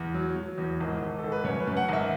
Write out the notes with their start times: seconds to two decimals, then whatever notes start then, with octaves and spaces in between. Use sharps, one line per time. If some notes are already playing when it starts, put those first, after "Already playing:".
Already playing: E2
0.14 F#3
0.36 F#3
0.58 E2
0.80 G#1
1.02 G#1
1.19 G#1 A4
1.32 B4
1.44 F#2 C#5
1.60 B4
1.67 F#2
1.77 F#5
1.88 G#1 E5